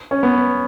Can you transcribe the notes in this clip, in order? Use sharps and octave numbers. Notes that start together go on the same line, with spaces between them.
C#4
B3